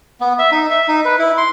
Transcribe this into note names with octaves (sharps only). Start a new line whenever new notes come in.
B3
E5
D#4
E5
D#4
B4
E4
C6